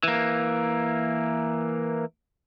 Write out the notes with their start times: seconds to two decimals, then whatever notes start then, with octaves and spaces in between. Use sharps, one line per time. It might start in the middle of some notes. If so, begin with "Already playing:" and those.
0.03 E3 A#3